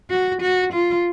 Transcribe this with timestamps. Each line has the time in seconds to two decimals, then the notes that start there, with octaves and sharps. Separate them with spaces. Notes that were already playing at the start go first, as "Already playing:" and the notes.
0.10 F#4
0.42 F#4
0.73 F4